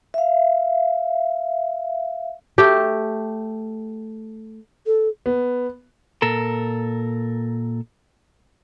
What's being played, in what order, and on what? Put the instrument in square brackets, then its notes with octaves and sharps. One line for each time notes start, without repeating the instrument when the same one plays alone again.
[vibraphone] E5 F5
[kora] A3 G4
[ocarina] A4
[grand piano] B3
[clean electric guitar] A#2 A4 A#4